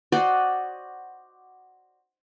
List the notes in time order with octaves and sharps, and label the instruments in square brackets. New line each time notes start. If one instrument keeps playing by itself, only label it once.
[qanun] F#4 C5 D5 D#5